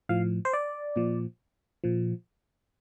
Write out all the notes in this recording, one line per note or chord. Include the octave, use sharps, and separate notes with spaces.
A2 F3 F5
C5
D5
A#2 F3
A#2 F3